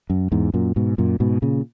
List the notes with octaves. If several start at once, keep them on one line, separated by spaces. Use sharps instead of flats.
F#2
E2 G#2
F#2 A#2
G#2 B2
F#2 A#2
G#2 B2
A#2 C#3